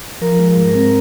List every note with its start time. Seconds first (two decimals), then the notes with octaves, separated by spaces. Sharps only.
0.21 F3 A#4
0.39 G#3
0.57 G#2
0.75 C4